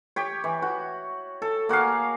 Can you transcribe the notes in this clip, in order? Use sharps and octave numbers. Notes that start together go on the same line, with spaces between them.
G4 C#5
E3
F#4
A4
A#3 F#4 G#4 F5